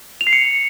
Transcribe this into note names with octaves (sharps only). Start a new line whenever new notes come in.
F7
C7
C#7